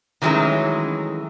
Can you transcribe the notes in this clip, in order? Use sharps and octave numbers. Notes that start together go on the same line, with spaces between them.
D#3 E3 F#3 G#3 A3 C#4